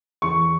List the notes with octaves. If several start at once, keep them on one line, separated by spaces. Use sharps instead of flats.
E2 C#6